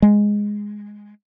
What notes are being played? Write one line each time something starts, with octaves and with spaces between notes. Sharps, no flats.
G#3